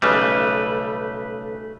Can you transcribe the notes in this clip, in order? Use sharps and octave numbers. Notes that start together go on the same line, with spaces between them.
B1 C#3 G3 A3 B4